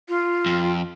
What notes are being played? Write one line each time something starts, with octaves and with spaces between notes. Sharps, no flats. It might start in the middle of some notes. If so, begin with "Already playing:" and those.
F4
F2